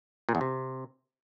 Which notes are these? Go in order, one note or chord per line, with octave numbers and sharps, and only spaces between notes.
A#2
E2
C3